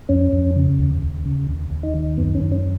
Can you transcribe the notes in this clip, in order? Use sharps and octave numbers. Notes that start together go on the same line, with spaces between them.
F2 C#4
F2
C#3
D#2
D#2
C#3
D#2
D#2
D#4
D#3
F#2 B3
C#4
F#2
C#4